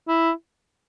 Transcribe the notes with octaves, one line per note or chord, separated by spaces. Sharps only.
E4